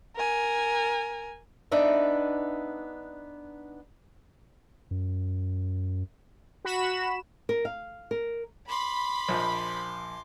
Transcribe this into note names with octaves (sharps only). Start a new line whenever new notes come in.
A#4 G#5
B3 D4 D#4 E5
F#2
F#4 B5 E7
A#4
F5
A#4
B5 C6 D6
A#1 F3 D#5